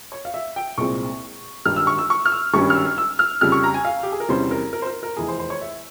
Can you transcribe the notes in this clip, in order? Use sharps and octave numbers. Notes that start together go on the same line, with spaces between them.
C#5
F5
E5
G5
C2 A#2 G#3 C4 C#6
G#1 G2 G3 F6
E6
C#6
E6
C#6
F6
E6
G#1 G2 G3 C#4 C#6
F6
E6
E6
F6
F2 C#3 G3 F6
C#6
A#5
G#5
F5
G4
G#4
A#4
E2 C3 G3 C#4 C5
A#4
A#4
C5
A#4
A#4
F1 E2 E3 G#4
C5
C5
C#5
E5